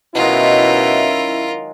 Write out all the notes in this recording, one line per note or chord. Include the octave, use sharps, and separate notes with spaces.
B2 D#3 F#3 G#3 C#4 E4 F4 A#4